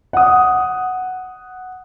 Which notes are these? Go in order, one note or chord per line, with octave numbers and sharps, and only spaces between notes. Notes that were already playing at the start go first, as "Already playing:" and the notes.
F#5 D#6